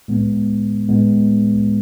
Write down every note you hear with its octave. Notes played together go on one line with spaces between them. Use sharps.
A2 G#3 B3
A2 G#3 B3